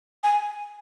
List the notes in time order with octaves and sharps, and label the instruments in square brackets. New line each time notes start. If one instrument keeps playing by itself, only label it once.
[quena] G#5